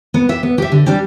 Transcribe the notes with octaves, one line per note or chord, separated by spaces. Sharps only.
B3
G4 E5
B3
G4 E5
D3
G3 D4 G4